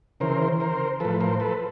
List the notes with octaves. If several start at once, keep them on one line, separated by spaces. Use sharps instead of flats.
C#3 E3 A#4 C5
A#4 C5
A2 F3 A4 B4
A#4 C5
A4 B4